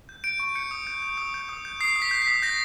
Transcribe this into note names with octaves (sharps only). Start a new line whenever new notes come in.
G6
G6 D7
C#6
G6 C#7
D#6
G6
G6
D#6
G6
D#6
G6
D#6 C7
D#6
B6
G6
B6
D#6
G6 A#6